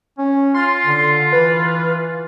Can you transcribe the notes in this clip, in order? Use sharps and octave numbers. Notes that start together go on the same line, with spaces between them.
C#4
F4 C6
D3
E3 B4